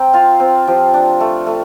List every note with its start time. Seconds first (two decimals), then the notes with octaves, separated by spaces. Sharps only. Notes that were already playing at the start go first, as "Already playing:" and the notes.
Already playing: C4 G5 A#5
0.14 F4 F5
0.40 C4
0.67 F3 G4
0.94 D4
1.20 A3
1.47 A3